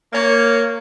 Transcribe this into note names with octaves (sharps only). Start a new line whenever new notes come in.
A#3 C#5